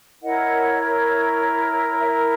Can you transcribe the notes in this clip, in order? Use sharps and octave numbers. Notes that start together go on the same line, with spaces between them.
E4 A#4 C#5 D#5 F#5
C#5 E5